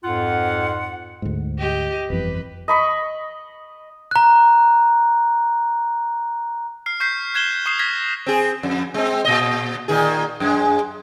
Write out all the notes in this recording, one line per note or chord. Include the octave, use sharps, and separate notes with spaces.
F2 G#2 F4 F#5
D2 G#2
G4 D#5
G1 F2 E3 B4
D#5 B5 C#6
A#5 F#6
F6 C7
C#6 G6 B6 C7
F#6 G#6 E7 G7
C#6 D#6 C7 E7
F6 G#6 A#6 B6
C4 G#4
F2
G#3 C4
A#2 D#5
A#2 D#3 G#4
F#2 G#3